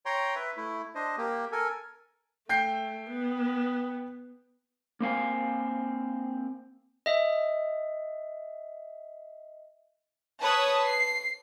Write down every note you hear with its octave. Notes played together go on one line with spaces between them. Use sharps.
C#5 G5 A#5 C6
B4 E5
A3 E4
D4 C5 D#5
A#3 G4
A4 A#4 G#5
A3 G5 G6 C7
B3
A#3 C4 F5 G#5
D#5 E5
B4 C#5 A5 D#6
C7